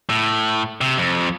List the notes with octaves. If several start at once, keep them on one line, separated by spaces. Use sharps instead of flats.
A2
C3
F2